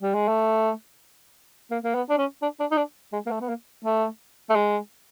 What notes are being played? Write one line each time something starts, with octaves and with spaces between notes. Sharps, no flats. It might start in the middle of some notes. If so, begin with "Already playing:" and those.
G3
G#3
A3
A#3
A#3
B3
D4
C#4
D4
D4
D#4
D4
G#3
A#3
A3
B3
A#3
A3
A3
G#3